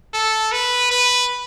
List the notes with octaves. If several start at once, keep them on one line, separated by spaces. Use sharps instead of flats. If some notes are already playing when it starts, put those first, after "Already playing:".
A4
B4
B4